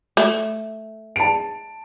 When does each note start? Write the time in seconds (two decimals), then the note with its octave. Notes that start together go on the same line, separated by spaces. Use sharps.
0.17 A3
1.16 A5 D7